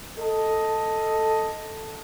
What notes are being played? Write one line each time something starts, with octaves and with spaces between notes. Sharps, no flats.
A4 D#5